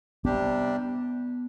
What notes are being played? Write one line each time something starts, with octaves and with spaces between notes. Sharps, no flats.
C3 G3 B3 D4 G4